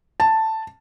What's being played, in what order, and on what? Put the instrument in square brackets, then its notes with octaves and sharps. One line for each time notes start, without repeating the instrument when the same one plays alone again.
[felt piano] A5